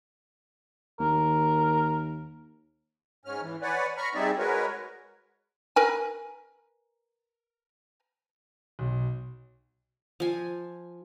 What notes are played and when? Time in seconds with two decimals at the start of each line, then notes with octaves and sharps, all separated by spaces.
1.00 D#2 A#4
3.25 G#2 C#4 F6
3.42 E3
3.62 B4 C#5 D5 F#5 G#5
3.97 A#5 B5 C#6 F6
4.15 G3 C4 D#4 G#4 D5 E5
4.38 G#3 F#4 A#4 B4 C#5
5.76 A#4 B4 G#5
8.79 B1
10.20 F3 G#5